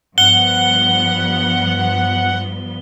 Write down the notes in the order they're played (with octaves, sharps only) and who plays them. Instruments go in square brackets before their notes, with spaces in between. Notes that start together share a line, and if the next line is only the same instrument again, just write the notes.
[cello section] G2 F3 B3 [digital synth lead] F#5 [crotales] G7